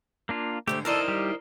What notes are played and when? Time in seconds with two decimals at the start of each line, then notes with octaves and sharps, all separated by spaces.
0.29 A#3 D4 F4
0.67 G#2 D3 A3 G4 C5
0.85 D#4 E4 A4 A#4 C5 D5 D#5
1.08 G3 G4